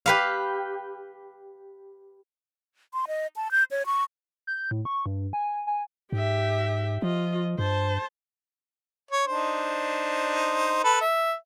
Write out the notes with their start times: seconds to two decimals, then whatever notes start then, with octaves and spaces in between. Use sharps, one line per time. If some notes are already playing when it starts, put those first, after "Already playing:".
0.06 G4 B4 F5
2.93 C6
3.08 D#5
3.36 A5
3.51 G6
3.71 C#5
3.86 C#6
4.47 G6
4.71 A2
4.85 C#6
5.06 G2
5.33 G#5
5.67 G#5
6.12 G#2 G4 E5
7.02 F3 F4 D#5
7.59 G2 C5 A5
9.11 C#5
9.27 D4 D#4 C5
10.84 A4 B4
11.01 E5